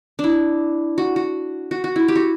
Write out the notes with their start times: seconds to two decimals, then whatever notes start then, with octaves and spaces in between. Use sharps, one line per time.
0.19 D4 E4
0.98 F#4
1.16 F#4
1.71 F#4
1.84 F#4
1.96 E4
2.08 G4
2.16 F#4